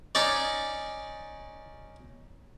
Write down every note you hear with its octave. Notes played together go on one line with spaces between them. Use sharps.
C#4 D#4 C#5 D5